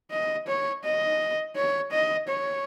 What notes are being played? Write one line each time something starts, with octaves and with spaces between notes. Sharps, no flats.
D#5
C#5
D#5
C#5
D#5
C#5